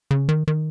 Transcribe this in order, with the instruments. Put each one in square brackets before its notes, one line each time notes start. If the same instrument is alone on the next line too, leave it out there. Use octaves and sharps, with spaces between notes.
[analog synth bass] C#3
D#3
D#3